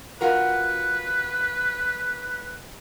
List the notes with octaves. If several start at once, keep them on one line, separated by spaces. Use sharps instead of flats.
F4 F#4 A#4 B4